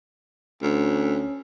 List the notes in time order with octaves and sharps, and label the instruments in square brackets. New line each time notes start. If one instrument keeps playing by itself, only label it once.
[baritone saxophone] D2 [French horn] C#4